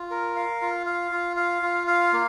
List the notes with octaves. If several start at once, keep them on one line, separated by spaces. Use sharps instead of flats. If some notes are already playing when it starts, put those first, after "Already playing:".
Already playing: F4
A#4
F5
F4
F5
F4
F5
F4
F5
A#3